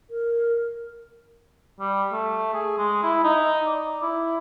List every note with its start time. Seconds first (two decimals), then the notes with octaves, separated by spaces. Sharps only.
0.10 A#4
1.80 G3
2.12 A3
2.54 G#4
2.78 G#3
3.03 E4
3.24 D#4
3.67 D5
4.03 E4